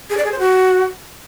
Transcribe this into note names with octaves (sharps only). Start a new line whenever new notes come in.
G#4
D5
G#4
C5
F#4